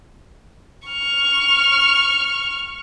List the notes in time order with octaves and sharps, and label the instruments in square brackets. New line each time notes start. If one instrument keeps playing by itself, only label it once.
[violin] C#6 F6